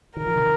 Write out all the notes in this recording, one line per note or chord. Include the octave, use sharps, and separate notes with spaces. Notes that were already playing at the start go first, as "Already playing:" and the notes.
D#3 A#4
F3
C3 D#3